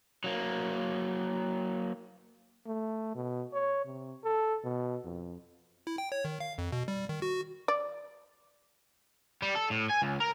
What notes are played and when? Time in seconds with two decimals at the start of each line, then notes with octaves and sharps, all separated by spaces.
0.24 F#3 A#3
2.67 A3
3.15 B2
3.54 C#5
3.86 C3
4.24 A4
4.64 B2
5.05 F2
5.87 E4
5.98 G5
6.12 C#5
6.25 D#3
6.40 F5
6.58 F2
6.72 B2
6.88 G3
7.09 D#3
7.22 F#4
7.68 D5
9.42 G3
9.55 A4
9.70 A2
9.90 G#5
10.02 C#2
10.20 A#4